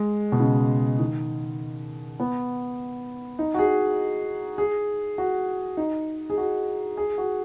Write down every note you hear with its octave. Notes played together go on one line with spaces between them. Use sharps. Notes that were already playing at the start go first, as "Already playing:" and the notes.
Already playing: G#3
B2
C#3
D#3
B3
D#4
F#4
G#4
G#4
F#4
D#4
G#4
F#4
G#4
F#4